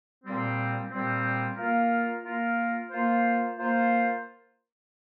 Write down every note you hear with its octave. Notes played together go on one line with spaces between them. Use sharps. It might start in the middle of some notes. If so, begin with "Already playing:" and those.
A#2 G3 C4
A#2 G3 C4
A#3 F4 A#4
A#3 F4 A#4
A#3 F4 C5
A#3 F4 C5